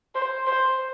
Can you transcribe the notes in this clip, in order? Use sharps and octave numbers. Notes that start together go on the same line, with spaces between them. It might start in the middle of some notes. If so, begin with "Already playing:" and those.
C5
C5